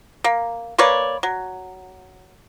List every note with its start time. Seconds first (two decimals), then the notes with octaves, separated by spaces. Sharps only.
0.24 A#3
0.78 A#3 B4 C#5 D5
1.23 F#3